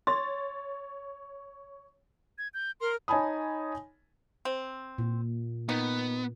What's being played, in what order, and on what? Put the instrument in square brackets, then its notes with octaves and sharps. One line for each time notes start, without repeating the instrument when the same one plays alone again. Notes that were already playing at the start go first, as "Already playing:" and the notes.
[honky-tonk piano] C#5 A6 [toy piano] C6
[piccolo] G#6
G6
[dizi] A#4 [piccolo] C6
[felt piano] D#4 C#5 G#5 A5 B5 D#6
[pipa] C4
[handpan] A#2
[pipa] D#3 [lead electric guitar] B3